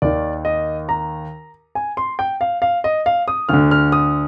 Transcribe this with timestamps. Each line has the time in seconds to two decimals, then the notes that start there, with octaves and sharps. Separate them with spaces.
0.02 D#2 D#3 D5
0.45 D#5
0.89 A#5
1.75 G#5
1.97 C6
2.19 G5
2.41 F5
2.62 F5
2.84 D#5
3.06 F5
3.28 D#6
3.49 D2 D3 F6
3.71 F6
3.92 D#6